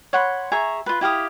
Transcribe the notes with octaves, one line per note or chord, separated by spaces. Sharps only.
C#5 F#5 B5 C6
G#4 E5 A#5 C#6
F4 B4
E4 G4 F5 D#6